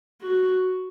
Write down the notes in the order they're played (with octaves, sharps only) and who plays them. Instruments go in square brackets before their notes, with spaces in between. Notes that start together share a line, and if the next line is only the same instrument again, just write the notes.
[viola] F#4